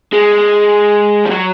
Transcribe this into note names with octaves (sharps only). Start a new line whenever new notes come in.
G#3
F3
F#3